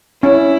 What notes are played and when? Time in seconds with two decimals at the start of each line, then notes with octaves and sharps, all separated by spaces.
0.23 C#4 E4